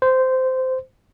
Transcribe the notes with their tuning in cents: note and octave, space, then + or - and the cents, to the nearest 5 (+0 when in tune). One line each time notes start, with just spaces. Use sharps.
C5 -15